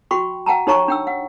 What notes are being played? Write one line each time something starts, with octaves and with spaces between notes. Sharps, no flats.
F#4 G5 B5 C#6
F#5 G5 A5 A#5
D#4 G4 C#5 A5 A#5 C#6
D4 G5 E6
F#5